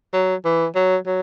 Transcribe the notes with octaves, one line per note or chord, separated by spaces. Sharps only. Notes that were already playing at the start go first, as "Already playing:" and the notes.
F#3
E3
F#3
F#3